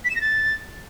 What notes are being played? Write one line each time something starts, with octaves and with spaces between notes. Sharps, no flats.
B6
E7
A#6
A6